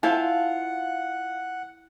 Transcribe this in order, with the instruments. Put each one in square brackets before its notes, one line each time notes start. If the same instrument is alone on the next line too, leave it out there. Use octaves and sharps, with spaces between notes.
[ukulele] E4 C5 A5 [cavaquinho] F4 F5 G#5 [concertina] F#5